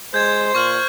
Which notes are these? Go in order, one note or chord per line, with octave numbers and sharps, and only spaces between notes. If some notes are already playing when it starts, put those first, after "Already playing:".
G#3 C5 G6 G#6
A#2 C#6 F6 F#7